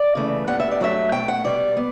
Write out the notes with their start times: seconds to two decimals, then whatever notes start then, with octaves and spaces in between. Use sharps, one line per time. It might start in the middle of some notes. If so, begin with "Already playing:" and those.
Already playing: D5
0.15 C#3 E3 A3
0.47 A2 G3 B3 F#5
0.60 E5
0.71 D5
0.80 G2 F#3 A3 E5
1.12 B2 A3 G5
1.28 F#5
1.44 B2 G3 B3 D5
1.77 B3